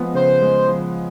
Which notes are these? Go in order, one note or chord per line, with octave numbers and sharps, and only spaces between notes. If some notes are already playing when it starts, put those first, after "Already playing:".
Already playing: F3 G#3 B3
C#3 C5
G#3
F3